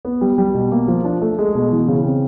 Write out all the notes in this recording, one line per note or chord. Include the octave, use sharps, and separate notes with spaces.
B3
G3
G3
B2
A#3
F3
D4
A3
G#3
B2
E3
C#3
C4